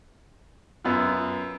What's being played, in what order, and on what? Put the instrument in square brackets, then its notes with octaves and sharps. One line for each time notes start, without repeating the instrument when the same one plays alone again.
[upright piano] F#2 B3 F4